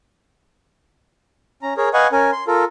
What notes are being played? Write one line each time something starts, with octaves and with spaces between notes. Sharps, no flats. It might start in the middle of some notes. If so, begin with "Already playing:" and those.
C#4 A#5
G#4 A#4 C#5
B4 D#5 F5 F#5 G#5 C#6
C#4 A#4 G#5
C6
F4 A4 A#4